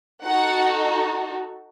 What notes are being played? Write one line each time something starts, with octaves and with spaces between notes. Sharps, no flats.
D#4 F#4 A4 F#5